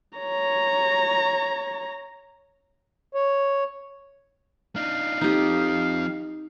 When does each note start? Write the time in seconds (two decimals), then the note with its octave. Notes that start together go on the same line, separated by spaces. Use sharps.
0.19 C#5 A#5
3.15 C#5
4.76 D4 D#4 F5
5.21 F3 C4 D#4 G4